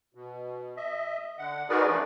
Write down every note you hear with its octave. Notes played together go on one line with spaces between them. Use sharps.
B2
D#5 E5
D3 F#5
D#4 F#4 G#4 A#4 B4 D5
E3 F3 G#3 A3 C#4 D4